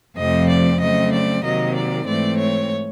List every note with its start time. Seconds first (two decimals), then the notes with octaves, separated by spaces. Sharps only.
0.17 F2 C3 F3 A3 C4 D#5
0.49 D5
0.80 C#3 F#3 A3 C4 D#5
1.13 D5
1.44 C3 D#3 F#3 A#3 D#5
1.76 D5
2.07 G#2 E3 A3 C4 D5
2.39 C#5